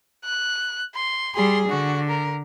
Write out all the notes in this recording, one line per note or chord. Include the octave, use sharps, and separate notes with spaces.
F#6
C6
G3 G#4 C6
D3 F#4
A#4